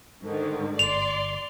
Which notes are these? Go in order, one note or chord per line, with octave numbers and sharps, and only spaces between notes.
G#2 D3 D#3
G1 D5 C6 F7